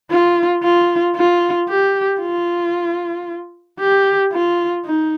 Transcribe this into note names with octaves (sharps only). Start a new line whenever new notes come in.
F4
F4
F4
G4
F4
G4
F4
D#4